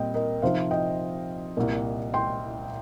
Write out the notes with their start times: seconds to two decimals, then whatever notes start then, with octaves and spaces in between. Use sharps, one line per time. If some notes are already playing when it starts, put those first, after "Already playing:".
Already playing: A#2 G3 C4 D#5 G5
0.14 A#4 D#5
0.42 C3 F3 D#4 C5 F5
0.71 D#5 G5
1.57 C2 A#2 A#3
2.14 G5 C6